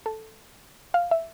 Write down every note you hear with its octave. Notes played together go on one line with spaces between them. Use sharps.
A4
F5
E5